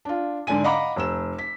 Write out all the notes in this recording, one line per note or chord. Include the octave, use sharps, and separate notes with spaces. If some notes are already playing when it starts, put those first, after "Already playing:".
D4 F4
G#2 D3 D5 G#5 D#7
D#5 F5 F#5 A#5 B5 D6
F1 E6 E7
B6